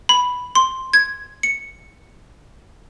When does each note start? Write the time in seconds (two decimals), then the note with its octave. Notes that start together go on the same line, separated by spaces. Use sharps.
0.09 B5
0.55 C6
0.93 G#6
1.43 C#7